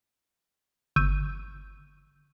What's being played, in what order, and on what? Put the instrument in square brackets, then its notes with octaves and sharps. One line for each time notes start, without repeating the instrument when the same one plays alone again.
[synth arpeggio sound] G1 C#6 E6 G6 D#7